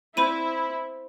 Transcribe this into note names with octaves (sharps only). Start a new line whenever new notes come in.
C4 E4 C5 B5 D#7